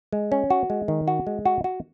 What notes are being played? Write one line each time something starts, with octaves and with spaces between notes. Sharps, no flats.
G#3
C#4
F#4
G#3
D#3
F#4
G#3
F#4
F#4